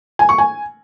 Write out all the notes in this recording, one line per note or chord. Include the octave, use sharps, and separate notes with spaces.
G#5
C#6
G#5